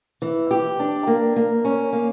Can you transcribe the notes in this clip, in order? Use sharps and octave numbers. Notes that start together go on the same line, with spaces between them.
E3
G4
D4
A#3
A#3
C#4
A#3